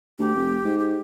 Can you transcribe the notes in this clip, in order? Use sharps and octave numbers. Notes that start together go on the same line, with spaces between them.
D2 G4
F1
G#2
G4